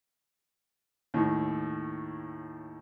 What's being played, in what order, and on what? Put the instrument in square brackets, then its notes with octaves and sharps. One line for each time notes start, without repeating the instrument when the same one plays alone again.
[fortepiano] D#2 A2